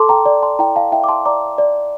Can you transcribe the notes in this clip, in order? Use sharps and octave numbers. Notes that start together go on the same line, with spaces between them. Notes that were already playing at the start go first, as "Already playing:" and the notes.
Already playing: A4 A5 C6 D6
G5 A#5
D5
A5 C6
E4 G5 A#5
F5 A5
E4 E5 G5
D6
A5 C6
D5 A#5 D6
D5